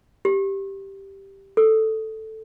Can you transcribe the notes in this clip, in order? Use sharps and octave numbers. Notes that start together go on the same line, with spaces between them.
G4
A4